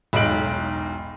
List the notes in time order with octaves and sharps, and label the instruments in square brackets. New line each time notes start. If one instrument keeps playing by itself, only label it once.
[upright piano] E1 B1 D#4 D7 F#7